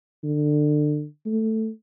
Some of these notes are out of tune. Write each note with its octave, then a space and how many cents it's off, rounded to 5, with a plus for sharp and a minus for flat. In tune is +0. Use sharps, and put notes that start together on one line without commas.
D3 +25
A3 +5